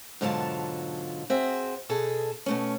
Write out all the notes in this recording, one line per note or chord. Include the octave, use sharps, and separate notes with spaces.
G#2 B2 D3 F#3 F4 A5
C4 F#4 G#4 E5
B2 G#4 A4
B2 A3 C#4